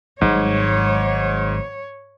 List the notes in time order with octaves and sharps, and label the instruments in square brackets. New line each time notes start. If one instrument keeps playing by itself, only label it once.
[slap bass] G#1 F#3 G3 [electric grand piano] G#2 [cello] C#5